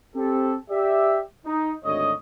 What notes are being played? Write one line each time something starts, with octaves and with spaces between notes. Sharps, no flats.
C4 G4 A4
G4 D5 E5
D#4
G#1 D2 D3 C#5 D#5